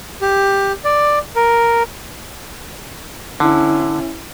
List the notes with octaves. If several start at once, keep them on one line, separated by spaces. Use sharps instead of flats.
G4
D5
A#4
D3 C#4 E4